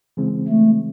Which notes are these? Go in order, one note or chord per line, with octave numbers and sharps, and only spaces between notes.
C#3 E3 G#3 C4
A3